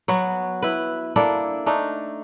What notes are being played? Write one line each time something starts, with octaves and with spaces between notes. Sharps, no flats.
F#3 B3 F#4
E4 B4
A#3 D4 E4 A4
A3 D4 D#4